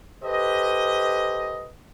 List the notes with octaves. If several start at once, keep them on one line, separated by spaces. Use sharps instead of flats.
G4 A4 B4 C5 D#5